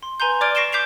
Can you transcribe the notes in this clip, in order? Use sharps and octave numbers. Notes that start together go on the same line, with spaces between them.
C6
B4 G#5 A#5 C6 G6
D5 D6 F6 G#6 D7
C#6 A#6 C7 D7 E7 G7
D6 G6 B6 C7 F7